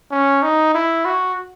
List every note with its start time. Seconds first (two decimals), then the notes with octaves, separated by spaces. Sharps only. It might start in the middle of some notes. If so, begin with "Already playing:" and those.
0.11 C#4
0.43 D#4
0.74 E4
1.05 F#4